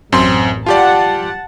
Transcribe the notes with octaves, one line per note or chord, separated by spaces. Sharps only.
A1 F#2 C4 C6
F4 G4 D5 F#5 A5